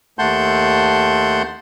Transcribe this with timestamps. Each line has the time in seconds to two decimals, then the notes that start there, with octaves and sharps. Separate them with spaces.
0.19 D#2 A3 F#5 A5 C6 G6